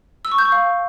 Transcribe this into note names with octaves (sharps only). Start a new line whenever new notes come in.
E6
C#6
G6
C#6
F5